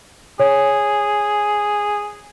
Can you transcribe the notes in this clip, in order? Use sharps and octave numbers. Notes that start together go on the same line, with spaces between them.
G#4 C#5